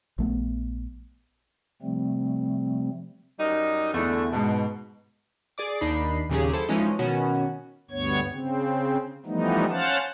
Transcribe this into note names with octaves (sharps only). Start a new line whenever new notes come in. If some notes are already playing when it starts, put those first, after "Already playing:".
A#1 A3 B3
C3 F3 G3 A3 C4
F#2 G3 D#4
E2 D3 A3 E4
G#2 B2 A5
G#4 D5 D6
D#2 D4 D#4 B5 C7
D#2 A#2 C#3 F#3 G4 G#4
E4 A4 C5
E3 F3 G#3 C#4 D#4
B2 D#3 B3 C#4 F#4
D2 G2 B3 C#5 G#6
C#3 C4
E3 F3 G3 A3 B3 D#4
C#4 C5 F5 F#5 A5